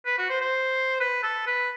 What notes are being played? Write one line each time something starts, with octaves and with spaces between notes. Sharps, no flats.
B4
F#4
C5
C5
B4
A4
B4